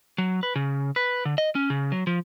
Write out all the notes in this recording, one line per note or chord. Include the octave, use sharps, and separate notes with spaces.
F#3
B4
C#3
B4
D3
D#5
C#4
C#3
F#3
F3